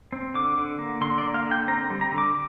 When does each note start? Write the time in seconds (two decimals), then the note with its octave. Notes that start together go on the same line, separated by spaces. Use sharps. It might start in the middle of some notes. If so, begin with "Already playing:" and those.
0.12 C4
0.34 D3 D6
0.57 D3
0.79 A#3
1.01 D3 C6
1.18 D5
1.23 A#3
1.34 F5
1.46 D3
1.51 G5
1.68 C4 A#5
1.90 G3
2.01 A#5
2.12 D3
2.18 D6